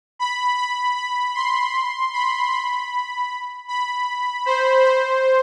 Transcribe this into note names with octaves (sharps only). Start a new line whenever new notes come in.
B5
B5
B5
C6
B5
B5
B5
C5
C5